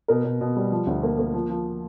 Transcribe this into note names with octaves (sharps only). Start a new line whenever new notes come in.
B2 A#4
B2
B2
G3
F3
D2
A#3
A#3
F3
F3